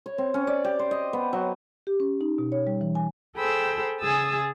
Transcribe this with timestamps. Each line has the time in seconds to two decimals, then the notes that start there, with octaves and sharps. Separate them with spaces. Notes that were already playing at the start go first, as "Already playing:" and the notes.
0.06 C#5
0.18 C4
0.34 C#4
0.47 D5
0.64 G4
0.79 C5
0.91 D#5
1.13 B3
1.33 F#3
1.87 G4
2.00 C#4
2.21 D#4
2.38 B2
2.52 C#5
2.67 G3
2.81 E3
2.95 G#5
3.36 G#4 A4 C5 G5 B5 E6
4.00 C#3 G#4 G#5 D#6 E6 A6